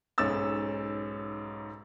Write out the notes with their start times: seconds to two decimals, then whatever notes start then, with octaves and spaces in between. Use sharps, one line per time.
0.18 B1 G#2 C#4 E6 A6